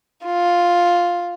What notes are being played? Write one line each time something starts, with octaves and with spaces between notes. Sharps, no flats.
F4